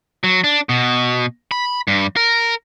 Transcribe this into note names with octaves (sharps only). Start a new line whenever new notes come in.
F#3
D4
B2
B5
G2
A#4